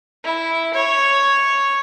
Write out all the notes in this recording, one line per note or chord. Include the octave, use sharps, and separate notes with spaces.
E4
C#5